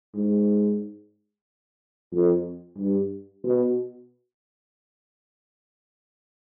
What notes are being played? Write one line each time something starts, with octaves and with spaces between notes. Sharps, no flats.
G#2
F2
G2
B2